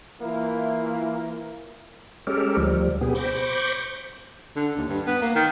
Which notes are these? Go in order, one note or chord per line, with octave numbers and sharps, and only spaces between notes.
E3 A#3 E4 F4 A#4
G#3 C#4 G4 A4 A#4
D2 F3 G3
B2 B3 G4 G#4
C5 B5 C#6 D6 G6 A#6
D3
D#2
G2
B3
A#3
D#3